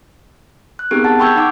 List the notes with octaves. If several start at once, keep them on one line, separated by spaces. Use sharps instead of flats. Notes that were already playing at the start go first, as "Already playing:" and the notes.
F#6
B3 C4 D#4 G4 G#4 A#4
F#5 A5 A6
G5 B5 C#6 E6 G6 G#6
D#4 F#5 D6